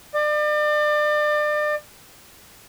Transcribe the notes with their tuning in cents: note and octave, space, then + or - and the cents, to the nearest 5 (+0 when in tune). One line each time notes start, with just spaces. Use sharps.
D5 +35